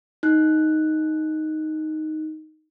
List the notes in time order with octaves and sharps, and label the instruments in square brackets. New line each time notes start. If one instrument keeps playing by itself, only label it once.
[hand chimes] D#4 F#6